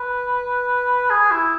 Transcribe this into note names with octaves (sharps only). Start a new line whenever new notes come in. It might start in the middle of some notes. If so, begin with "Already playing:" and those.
Already playing: B4
G#4
E4